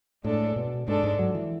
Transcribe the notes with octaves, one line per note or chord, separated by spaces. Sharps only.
A2 G#3 D4 A4
B2
G#2 G#3 D4 A4
G#2
F#3
E3